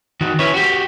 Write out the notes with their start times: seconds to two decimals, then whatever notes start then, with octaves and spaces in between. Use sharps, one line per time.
0.21 D#3 F#4
0.39 C#4 E4 B4 C#5
0.54 F#4 G4